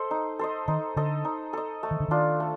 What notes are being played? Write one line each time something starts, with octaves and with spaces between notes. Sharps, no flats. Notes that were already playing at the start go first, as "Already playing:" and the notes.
Already playing: A4 C5 D#5
D#4
A4 C5 D#5
D#3 D#4
D3 A4 D#5
D#4
A4 D#5
A3
D#3
D3
D#3 D4 F4
A3